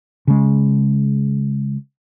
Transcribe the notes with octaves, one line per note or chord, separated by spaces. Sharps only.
C#3 G#3